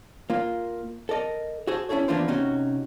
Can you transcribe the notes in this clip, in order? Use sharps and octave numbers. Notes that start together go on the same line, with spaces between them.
A#3 F4
A4 A#4 D5 D#5
F#4 G#4 A4 C5
C#4 E4 G#4 A4 C#5
E3 A#3 B3 D4 F4 C5
C3 C#4 D#4 F#4